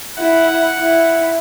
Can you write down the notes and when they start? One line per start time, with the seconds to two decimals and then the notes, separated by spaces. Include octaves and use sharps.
0.18 E4 F#5
0.79 E4